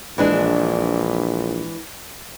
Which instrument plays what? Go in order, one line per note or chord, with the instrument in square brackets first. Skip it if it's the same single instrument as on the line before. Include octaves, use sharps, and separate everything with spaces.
[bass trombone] A#1 [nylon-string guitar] E3 G#3 D4